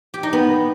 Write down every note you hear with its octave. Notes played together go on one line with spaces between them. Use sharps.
G4
D#4
B3